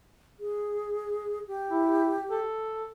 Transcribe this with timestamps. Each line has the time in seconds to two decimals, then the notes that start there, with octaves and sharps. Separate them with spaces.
0.40 G#4
1.47 G4
1.71 E4
2.31 A4